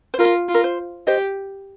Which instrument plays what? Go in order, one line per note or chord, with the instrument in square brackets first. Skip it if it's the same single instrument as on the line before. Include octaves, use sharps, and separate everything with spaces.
[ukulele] C5
[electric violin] F4 [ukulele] A#4
[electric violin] F4
[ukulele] A#4
C5
[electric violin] G4 [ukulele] C5 D#5